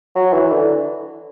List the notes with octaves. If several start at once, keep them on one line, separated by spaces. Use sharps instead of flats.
F#3
E3
D3